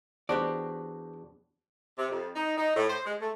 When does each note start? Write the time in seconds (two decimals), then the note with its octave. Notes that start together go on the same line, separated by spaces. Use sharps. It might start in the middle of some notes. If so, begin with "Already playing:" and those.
0.29 E2 D4 F#4 G4 C5 D5
1.98 C3
2.10 F2
2.36 D#4
2.57 D#4
2.75 A2
2.89 C5
3.05 G#3
3.20 A3